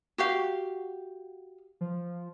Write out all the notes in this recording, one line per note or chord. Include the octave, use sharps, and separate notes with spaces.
F#4 G4 F5
F3